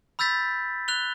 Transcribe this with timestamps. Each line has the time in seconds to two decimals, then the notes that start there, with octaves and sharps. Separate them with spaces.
0.19 B5 E6 G6 A6 B6
0.88 F#6 F7 G7